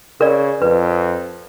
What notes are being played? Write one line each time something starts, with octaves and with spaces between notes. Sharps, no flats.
C#3 A#4 D5
F2 B4